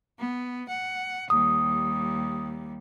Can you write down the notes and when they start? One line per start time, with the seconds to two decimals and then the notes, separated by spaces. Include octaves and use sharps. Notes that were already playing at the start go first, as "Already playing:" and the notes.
0.19 B3
0.69 F#5
1.30 D#2 G3 D#6